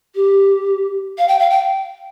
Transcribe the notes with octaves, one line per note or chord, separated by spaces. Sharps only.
G4
F5
G5
F5
G5